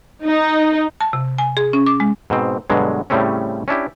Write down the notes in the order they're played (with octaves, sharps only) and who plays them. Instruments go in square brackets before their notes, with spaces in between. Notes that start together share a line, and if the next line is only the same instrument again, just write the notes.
[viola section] D#4
[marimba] A5
C3
G#5
G#4
C#4
D6
G#3
[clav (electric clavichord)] G#2 B2 C4
G2 B2 D3 F#3 G#3
A2 C#3 G3 A3 C4 C#4
C#4 D4 E4 G4